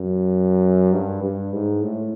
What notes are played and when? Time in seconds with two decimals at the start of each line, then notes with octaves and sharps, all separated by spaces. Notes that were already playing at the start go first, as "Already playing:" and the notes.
Already playing: F#2
0.93 G2
1.23 G2
1.53 G#2
1.82 A2